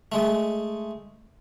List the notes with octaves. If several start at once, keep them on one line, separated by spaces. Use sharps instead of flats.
G#3 A3